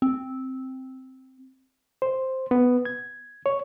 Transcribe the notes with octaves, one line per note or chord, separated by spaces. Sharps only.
C4
C5
B3
G#6
C#5